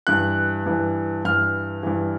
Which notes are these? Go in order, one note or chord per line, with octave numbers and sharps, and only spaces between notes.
G2 E3 F#6
G2 E3
G2 E3 F6
G2 E3